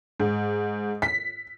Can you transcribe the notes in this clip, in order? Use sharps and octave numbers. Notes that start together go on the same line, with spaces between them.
G#2
B6